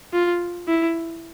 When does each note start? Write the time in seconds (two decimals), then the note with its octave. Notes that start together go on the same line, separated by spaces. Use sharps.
0.13 F4
0.68 E4